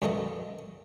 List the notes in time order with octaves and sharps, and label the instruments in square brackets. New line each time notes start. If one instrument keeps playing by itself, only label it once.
[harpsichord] F#2 F3 B3 A4 D#5